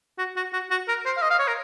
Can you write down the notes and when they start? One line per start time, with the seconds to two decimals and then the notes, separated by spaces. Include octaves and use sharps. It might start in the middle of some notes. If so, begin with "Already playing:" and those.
0.18 F#4
0.36 F#4
0.53 F#4
0.71 F#4
0.88 A#4
1.05 C5
1.17 F5
1.22 D#5
1.30 F5
1.39 C#5
1.48 A#4